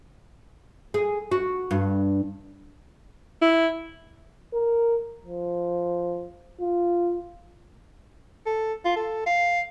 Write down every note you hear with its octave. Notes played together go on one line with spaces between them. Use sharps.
G#4
F#4
G2
E4
A#4
F3
F4
A4
F4
A4
F5